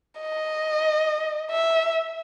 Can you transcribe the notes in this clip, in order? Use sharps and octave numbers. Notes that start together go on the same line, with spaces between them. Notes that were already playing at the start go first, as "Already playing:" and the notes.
D#5
E5